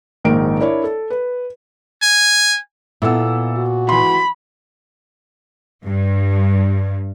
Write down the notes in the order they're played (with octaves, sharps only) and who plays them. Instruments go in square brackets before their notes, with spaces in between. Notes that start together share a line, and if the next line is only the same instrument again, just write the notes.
[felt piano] A#1 G#2 D#3 A#4 D7
D4 E4 A#4 C#5 D5
A4
B4
[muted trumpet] G#5
[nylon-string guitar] A#2 B3 [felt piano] E4 A4 E6
[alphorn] F#4
[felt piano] E3 C6 [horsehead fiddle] B5
[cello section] G2